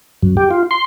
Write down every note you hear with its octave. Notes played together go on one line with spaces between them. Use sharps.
F#2
G4
F4
C6